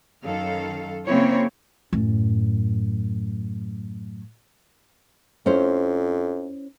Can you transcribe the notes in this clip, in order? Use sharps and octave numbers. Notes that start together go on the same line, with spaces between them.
F#2 D#3 A4 F5
C#3 A#3 C4 E4 C#5
F#2 A2
F2 C#4 E4 C5